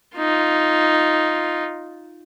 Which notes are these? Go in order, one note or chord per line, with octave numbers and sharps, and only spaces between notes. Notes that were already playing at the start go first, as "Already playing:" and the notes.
D#4 F4